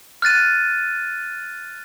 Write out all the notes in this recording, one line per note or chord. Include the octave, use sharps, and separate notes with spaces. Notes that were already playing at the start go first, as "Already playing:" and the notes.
F6 F#6 A6 D#7